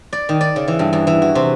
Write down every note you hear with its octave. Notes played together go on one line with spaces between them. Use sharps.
D5
D#3
D5
C#3
E3
G2
E2
E3
F#4
C3